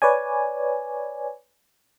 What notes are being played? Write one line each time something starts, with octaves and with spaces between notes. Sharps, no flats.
B4 C#5 D5 G#5